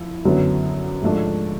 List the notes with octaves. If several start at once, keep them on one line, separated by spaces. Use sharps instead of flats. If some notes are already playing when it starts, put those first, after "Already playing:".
Already playing: F3 E4
F#2 D3 F#3 B3
G#2 F3 A3 D4